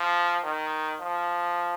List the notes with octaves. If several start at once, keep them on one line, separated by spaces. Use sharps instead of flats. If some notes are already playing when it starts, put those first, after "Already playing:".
Already playing: F3
D#3
F3